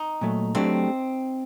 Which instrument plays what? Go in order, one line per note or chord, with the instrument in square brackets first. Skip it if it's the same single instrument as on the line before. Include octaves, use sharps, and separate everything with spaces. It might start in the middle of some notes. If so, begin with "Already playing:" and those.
Already playing: [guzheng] D#4
[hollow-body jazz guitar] A#2 F#3 A3
[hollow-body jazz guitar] F#3 A3 D4 G4 [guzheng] C4